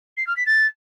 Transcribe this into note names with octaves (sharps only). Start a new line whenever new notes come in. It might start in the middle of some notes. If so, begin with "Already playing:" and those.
C7
F6
B6
A6